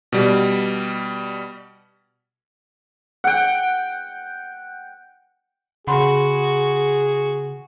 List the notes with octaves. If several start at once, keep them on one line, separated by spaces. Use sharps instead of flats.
B2 G3
F#5 G5
C#3 F#4 G#4 F#5 B5 C6